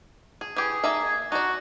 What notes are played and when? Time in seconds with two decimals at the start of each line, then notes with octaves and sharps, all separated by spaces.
0.41 G#4
0.56 E3 G4 G#4
0.84 A#3 D#4 E5
1.32 D#4 F#4 D5